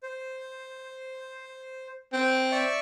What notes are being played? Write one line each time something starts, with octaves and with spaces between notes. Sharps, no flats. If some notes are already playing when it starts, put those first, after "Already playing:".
C5
C4
D5 E5 C#6